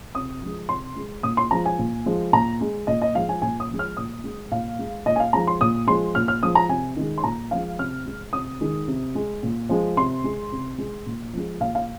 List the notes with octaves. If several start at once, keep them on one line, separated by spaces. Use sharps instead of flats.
C3 D#6
F3 G#3
C3 C6
G#3
A#2 D#6
C6
F3 G#3 A#5
G#5
A#2
F3 G#3
A#2 A#5
G#3
A#2 D#5
D#5
F3 G#3 F5
G#5
A#2 G#5
D#6
F3 G#3
F6
A#2 D#6
G#3
A#2 F5
G#3
A#2 D#5
G#5
F5
F3 G#3 A#5
C6
A#2 D#6
F3 G#3 C6
A#2 F6
F6
F3 G#3 D#6
A#5
C3 G#5
D#3 G#3
C6
A#2 A#5
F3 G#3 F5
C3 F6
G#3
C3 D#6
D#3 G#3
C3
G#3
A#2
F3 G#3
C3 C6
G#3
C3
G#3
A#2
F3 G#3
A#2 F5
F5